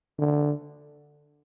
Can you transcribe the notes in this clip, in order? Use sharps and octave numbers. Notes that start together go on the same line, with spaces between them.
D3